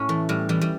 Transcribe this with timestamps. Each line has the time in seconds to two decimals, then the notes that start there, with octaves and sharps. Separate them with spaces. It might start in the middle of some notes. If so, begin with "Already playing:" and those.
Already playing: A2 C#4
0.09 E3 A3
0.29 A2 G3
0.49 E3 G3
0.61 G3